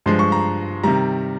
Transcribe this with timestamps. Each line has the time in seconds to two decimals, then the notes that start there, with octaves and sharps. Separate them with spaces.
0.06 G2 F3 G#3 C6
0.19 C#6
0.32 A#5
0.83 C3 D#3 G3 A#5